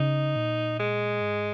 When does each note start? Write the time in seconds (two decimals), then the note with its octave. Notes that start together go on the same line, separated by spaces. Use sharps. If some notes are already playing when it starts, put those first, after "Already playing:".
Already playing: C#3 D#4
0.36 A#2
0.79 G#3
1.21 G#2